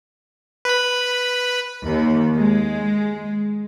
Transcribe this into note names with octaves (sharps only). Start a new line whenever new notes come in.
B4 B5
D#2
G#3